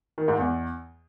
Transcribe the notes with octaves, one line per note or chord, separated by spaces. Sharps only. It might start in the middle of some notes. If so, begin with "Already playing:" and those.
D#3
G#2
E2